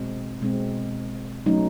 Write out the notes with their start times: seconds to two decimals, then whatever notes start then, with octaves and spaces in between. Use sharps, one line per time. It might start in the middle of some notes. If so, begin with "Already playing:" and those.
Already playing: B2 G#3 C4
0.42 B2 G#3 C4
1.46 F#3 A3 C#4 D#4